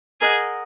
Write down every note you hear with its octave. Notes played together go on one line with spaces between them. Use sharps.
G#4 A#4 D#5 F#5